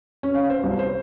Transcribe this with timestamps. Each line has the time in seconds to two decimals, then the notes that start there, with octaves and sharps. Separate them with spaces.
0.23 C#4
0.35 F5
0.50 C5
0.64 C2
0.79 C5